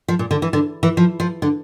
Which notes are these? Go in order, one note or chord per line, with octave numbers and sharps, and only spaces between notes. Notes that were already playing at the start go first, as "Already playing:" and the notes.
F3
A#2
D3
E3
D3
E3
F3
F3
D3